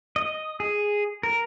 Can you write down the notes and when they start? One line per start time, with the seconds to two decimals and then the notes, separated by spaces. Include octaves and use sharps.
0.16 D#5
0.60 G#4
1.23 A#4